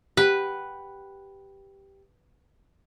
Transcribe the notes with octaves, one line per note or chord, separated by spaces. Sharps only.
G4 B4 F#5